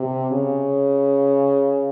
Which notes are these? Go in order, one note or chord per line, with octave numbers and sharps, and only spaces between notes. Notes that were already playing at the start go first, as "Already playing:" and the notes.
Already playing: C3
C#3